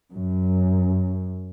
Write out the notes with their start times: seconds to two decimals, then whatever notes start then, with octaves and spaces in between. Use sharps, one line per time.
0.13 F#2